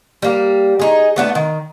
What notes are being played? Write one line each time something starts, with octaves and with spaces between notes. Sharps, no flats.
G3 A#3
D#4 G#4
A3 B3 D4
D#3